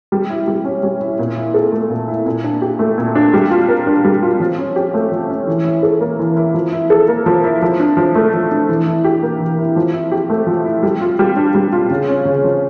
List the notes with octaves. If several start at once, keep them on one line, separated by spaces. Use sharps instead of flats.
G3
E4
G3
C#4
G3
E4
A#2
E4
A4
A3
A#2
E4
A#2
D4
G4
A3
A#2
D4
G3
F4
A#4
D4
G3
F4
F3
C#4
G4
A3
F3
C#4
E3
E4
A4
A#3
E3
E4
F3
E4
A4
A#3
F3
E4
F3
D4
F3
A3
F3
D4
E3
E4
G4
A#3
E3
E4
F3
E4
G4
A3
F3
E4
G3
F4
G3
D4
G3
F4
C#3
C#4
C#3
F3